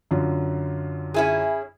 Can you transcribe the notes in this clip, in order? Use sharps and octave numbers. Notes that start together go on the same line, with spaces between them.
F#2 D3 F4
C#4 E4 G#4